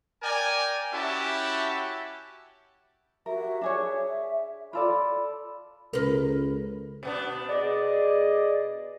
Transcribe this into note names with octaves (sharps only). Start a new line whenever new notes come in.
A#4 D5 G5 G#5
C#4 E4 F#4 G4 E5 A5
F#4 G4 A#4 E5
D4 G#4 C#5 E5
F4 A4 D5 B5
C#2 A#4 B4
B2 B3 D4
G#4 D5 D#5